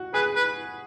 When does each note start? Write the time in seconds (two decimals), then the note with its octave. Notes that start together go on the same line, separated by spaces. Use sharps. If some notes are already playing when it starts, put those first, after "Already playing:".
Already playing: F#4
0.14 G#4 B4
0.36 B4